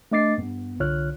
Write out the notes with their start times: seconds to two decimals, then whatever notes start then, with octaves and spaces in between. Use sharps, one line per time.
0.12 A3 D4 D#5 D6 A6 C7
0.38 G2 B3
0.79 C2 D3 F4 C#5 F6 F#6